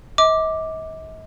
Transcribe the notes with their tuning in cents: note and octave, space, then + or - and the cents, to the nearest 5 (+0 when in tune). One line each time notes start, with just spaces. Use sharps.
D#5 +45 D6 +0